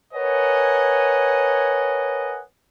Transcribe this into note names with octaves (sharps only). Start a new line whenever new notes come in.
A#4 B4 C#5 D#5 F#5 G#5